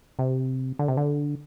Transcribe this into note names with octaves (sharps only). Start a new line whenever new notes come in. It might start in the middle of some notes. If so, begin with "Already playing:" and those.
C3
D3
C3
D3